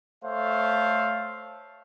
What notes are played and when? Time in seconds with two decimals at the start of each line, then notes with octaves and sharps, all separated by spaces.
0.25 A3 A4 C5 C#5 E5 F5